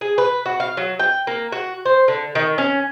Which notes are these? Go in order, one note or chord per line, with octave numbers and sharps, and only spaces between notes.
G#4
B4
F#4
F5
F#3
G5
A#3
F#4
C5
D3
D#3
C#4